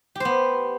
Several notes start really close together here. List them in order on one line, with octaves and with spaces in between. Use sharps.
G4 C5 B3